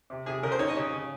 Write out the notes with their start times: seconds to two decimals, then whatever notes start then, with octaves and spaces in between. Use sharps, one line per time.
0.10 C3
0.26 C3 G#4
0.43 C#3 A#4
0.52 C5
0.59 D#4 C#5
0.68 D#5
0.76 C#3 C#5
0.93 C#3